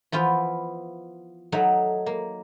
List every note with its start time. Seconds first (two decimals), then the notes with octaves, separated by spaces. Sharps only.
0.12 E3 F3 B3 F4
1.52 F#3 A3 D#4 F#5
2.06 A#3